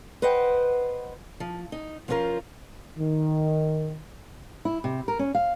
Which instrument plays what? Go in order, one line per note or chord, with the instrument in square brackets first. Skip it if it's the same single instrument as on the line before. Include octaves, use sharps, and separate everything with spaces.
[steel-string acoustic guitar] B4 C5 D#5 F#5 G5
F3
D#4
F3 B3 C#4 F4 A#4 C5
[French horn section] D#3
[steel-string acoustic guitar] E4
C3
A#4
C#4
F5